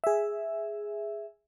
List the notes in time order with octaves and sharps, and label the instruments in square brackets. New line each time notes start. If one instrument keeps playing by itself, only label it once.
[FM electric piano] G#4 E5